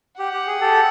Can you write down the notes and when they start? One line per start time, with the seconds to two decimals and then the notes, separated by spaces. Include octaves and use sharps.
0.19 G4 F#5
0.33 G4
0.47 G#4
0.61 G4 A4